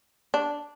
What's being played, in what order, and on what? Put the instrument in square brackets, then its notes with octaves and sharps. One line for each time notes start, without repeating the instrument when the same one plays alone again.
[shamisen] D4